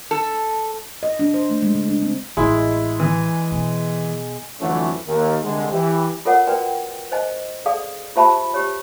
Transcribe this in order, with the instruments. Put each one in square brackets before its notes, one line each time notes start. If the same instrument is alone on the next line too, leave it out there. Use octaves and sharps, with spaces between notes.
[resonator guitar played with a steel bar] A4
[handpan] D#5
D4
C5
A3
G#3
C#3
D4
C4
[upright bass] A1 [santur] G#3 [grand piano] E4
[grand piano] E3
[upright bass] B2
[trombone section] F2 D3 E3 F#3 A3 C#4
D#2
C2 D3 G#3
E3 G4
[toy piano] F4 A4 A#4 C#5 F#5
F#4 A#4 B4 D5 G5
C5 D#5 G#5
G#4 A4 D5 F5 D#6
F4 G4 C5 E5 A5 B5
G4 C#5